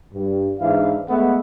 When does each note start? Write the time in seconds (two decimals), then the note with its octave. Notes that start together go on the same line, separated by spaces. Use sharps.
0.14 G2
0.60 G#2 E3 D4 E4 F5
1.09 G#3 A3 B3 E5 F#5